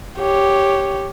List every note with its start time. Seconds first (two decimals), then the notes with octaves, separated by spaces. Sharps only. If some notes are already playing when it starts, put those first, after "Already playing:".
0.19 G4 C#5